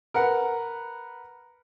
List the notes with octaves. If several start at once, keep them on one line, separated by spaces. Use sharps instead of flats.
A#4 B4 F#5